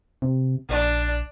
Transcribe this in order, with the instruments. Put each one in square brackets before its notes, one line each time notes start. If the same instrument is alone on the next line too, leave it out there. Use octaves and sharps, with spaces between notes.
[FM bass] C3
[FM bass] A#1 [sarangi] D4